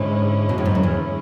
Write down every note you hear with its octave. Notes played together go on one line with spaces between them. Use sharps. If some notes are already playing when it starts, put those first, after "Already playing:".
Already playing: G#2 D3 G#3 C#4 E4
B2
A2
G#2
F#2
E2